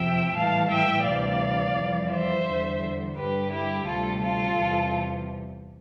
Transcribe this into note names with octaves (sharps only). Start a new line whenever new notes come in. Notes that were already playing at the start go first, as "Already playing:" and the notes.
Already playing: F2 C3 F3 E5 G5
A2 E3 G3 F5 A5
E5 G5
D2 C3 E3 G3 D5 F5
F2 E3 G3
C5 E5
E2 D3 G3
G2 D3 G3 G4 B4
E4 G4
D2 C3 G3 F4 A4
F4 A4
E2 C3 G3